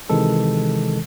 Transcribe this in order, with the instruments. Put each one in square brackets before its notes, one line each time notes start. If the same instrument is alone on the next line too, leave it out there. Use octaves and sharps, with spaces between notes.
[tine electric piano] C3 D#3 E3 G#3 A4